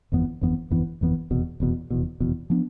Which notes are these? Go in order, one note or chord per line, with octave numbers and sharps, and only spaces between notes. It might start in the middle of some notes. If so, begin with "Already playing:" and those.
G1 F2 E3 B3
G1 F2 E3 B3
G1 F2 E3 B3
G1 F2 E3 B3
F1 E2 B2
F1 E2 B2
F1 E2 B2
F1 E2 B2
F3 B3 D4